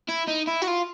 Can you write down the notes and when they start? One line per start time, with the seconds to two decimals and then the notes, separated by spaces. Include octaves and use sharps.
0.08 E4
0.27 D#4
0.47 E4
0.62 F#4
0.67 F4